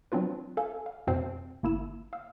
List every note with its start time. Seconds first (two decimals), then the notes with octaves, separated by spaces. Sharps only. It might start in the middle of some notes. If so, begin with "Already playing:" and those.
0.12 F#3 C4 D4 F4 B4
0.57 A4 F5 G#5
0.86 F5
1.07 F2 B2 C4 C5 C7
1.63 G1 A#3 E4 E6 E7
2.13 F5 E6